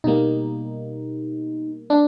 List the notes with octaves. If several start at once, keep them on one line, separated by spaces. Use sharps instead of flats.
B2 G3 A#3 D#4
D4